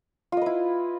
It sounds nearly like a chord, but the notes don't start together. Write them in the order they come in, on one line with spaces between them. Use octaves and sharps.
F4 D#5 B4 E4